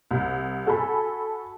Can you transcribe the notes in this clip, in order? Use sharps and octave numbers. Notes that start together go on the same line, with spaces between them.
C2
F#4 A4 G#5 A5 B5